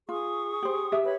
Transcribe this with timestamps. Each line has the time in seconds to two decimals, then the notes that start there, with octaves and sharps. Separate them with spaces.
0.09 F4 G#4 C#6 D#6
0.62 G4 C5
0.92 G4 E5
1.04 B4 C#5 B5